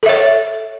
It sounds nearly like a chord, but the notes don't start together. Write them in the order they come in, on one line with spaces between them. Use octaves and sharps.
A4 E5 C#5